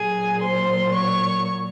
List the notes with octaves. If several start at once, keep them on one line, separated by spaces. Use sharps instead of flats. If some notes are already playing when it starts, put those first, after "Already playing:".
Already playing: A#2 F#3 A#3 G#4 G#5
C5 C6
C#5 C#6